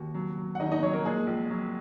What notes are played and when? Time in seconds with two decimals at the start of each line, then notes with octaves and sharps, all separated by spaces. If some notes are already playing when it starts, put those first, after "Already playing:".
Already playing: D#2 F#4
0.14 F#3
0.38 F#3
0.55 F#5
0.60 D#2 D#4 D#5
0.71 D#4 D#5
0.83 F#3 C#5
0.93 A#3 A#4
1.05 A#2 G#3 G#4
1.27 A#1
1.50 F#3